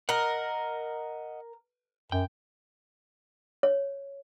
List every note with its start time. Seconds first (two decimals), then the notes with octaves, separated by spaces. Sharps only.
0.09 A#4 D#5 F#5
2.12 F#2 G5
3.63 C#5